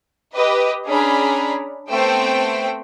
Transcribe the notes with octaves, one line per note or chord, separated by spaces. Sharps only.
G4 B4 D#5
C#4 D4 G#4 A#5 B5
A3 B3 C4 C5 G5